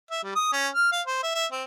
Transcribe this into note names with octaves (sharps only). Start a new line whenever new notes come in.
E5
G3
D#6
C#4
F6
F5
C5
E5
E5
C4